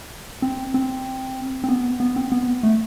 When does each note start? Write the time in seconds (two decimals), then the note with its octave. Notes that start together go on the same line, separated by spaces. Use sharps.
0.42 C4
0.74 C4
1.64 C4
1.69 B3
2.00 B3
2.16 C4
2.32 B3
2.63 A3